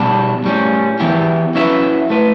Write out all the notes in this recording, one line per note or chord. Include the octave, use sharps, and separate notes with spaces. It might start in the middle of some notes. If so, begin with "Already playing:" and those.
Already playing: B2 G3 D4
A2 G3 C#4
E3 B3 E4 G4
F#3 C#4 E4 B4 E5
A3 E4 B4